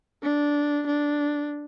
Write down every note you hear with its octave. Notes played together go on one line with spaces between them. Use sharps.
D4
D4